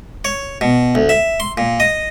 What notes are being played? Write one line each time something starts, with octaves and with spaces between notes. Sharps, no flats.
C#5
B2
D2
E5
C6
A#2
D#5